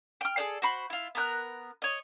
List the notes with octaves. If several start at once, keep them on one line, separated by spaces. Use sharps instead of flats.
G5 F6
G#4 A4 C5 D5
F#4 C5 B5
E4 F4
B3 A#4 F#6
C#5 D#5